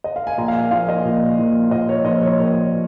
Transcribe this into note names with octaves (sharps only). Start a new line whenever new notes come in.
D#5
F5
G#5
A#1 A#5
F5
G#5
A#2 F3 F5
D#5
A#1
A#2 F3
A#1 D#5
C#5
A#2 F3 D#5
C#5
A#1 C#5